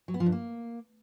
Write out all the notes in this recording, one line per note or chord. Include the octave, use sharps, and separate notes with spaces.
F#3
B3
F3
G2
A#3